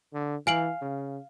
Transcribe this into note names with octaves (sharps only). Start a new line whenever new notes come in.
D3
E3 F5 G#5 D7 F#7
C#3